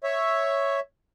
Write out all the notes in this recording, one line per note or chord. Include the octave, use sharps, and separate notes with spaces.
C#5 E5